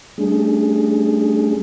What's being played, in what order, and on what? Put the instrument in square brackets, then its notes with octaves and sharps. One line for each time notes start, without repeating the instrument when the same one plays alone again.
[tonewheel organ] G3 A3 C#4 D4 G#4